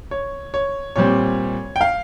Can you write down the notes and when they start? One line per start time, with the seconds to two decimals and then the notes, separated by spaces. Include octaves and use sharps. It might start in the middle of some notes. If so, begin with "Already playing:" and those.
0.11 C#5
0.54 C#5
0.96 A#2 G3 C4 C#5
1.76 G5
1.81 F5